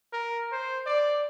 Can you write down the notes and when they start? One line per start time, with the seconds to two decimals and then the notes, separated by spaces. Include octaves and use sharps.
0.13 A#4
0.52 C5
0.86 D5